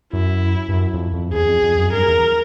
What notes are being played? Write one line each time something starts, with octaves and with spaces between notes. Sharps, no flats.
F#2 E4
G2
F#2
F2
F2
E2 G#4
F2
F2
F#2
G2 A#4
E2